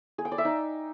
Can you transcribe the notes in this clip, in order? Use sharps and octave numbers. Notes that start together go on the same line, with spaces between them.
G#4
G5
D5
E5
D#4